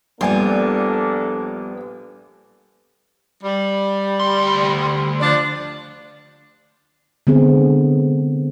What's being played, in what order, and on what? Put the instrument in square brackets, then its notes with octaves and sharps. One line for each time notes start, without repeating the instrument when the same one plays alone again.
[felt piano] A#1 G#5 [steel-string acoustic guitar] G3 B3 [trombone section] A#3 D4 A4
[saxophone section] G3
[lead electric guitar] D2 C6
[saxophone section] F3 D4
[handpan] D3 G#3 B3 C4 G#4